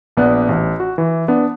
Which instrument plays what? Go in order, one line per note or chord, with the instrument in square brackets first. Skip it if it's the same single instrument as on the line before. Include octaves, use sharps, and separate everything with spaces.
[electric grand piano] A#1 B3 D5 F#6
A1
F#4
E3
B3 D4